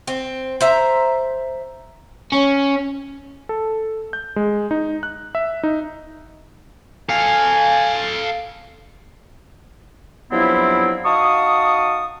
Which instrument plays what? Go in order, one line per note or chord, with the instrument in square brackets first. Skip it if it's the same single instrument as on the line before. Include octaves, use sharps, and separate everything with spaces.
[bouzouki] C4
C5 E5 A#5
[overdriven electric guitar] C#4
[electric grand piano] A4
G6
G#3
D#4
F#6
E5
D#4
[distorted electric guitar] A4 F5 [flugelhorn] G#5
[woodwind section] G2 F3 F#3 B3 C4 E4
D#4 F#4 F5 A5 C#6 D#6